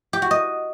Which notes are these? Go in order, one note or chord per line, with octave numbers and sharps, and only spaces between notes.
G4
F#4
D#5